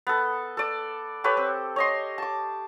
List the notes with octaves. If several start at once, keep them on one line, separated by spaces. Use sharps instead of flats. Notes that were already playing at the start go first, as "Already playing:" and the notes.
B3 A4
A4 D5
G4 A4 B4 C#5
C4
C#5 D#5 C6
A5 D6